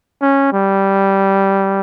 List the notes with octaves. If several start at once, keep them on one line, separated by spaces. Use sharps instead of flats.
C#4
G3